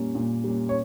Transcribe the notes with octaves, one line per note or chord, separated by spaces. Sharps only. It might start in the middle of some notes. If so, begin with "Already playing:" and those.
Already playing: A#2 G3 A#3 C#4
A#2
G3 A#3 C#4
C#5